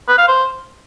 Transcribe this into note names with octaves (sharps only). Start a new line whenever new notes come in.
B4
F5
C5